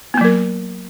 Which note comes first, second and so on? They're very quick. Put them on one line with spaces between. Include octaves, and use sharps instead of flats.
B3 A#3 F#3 A#4